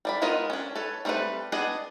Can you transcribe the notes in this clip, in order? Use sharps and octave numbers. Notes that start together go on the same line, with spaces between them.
G3 D5 B5
G#3 B3 F4 A#4 D#5
C#4 D4
A4 B4 C#5
G3 A3 C4 A4 B4
B3 D4 G#4 D5 D#5